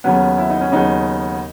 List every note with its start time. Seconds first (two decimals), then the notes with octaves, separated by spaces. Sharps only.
0.04 D#2 C#3 F#3 B3 C#4
0.38 E4
0.50 D#4
0.61 C#4
0.72 D#2 C#3 F#3 B3 D#4